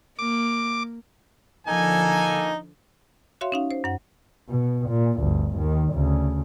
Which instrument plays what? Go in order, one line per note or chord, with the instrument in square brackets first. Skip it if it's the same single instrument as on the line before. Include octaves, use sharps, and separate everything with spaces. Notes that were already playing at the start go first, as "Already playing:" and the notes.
[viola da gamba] A#3 [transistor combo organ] D6
[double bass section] D3 F3 [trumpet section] A#3 A4 G#5 [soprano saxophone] D#4
[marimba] F#4 C#5 E5 F5 C6
C#4 D#4 F5
C5
F#2 F#5
[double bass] B2
A#2
G1 D2
D#2 D#3
D2 C#3